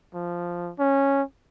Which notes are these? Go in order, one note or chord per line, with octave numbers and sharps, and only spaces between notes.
F3
C#4